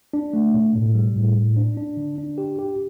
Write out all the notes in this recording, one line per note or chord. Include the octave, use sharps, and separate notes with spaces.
D4
A3
B2
A2
G3
A2
A2
D4
D4
D3
D4
G4
G4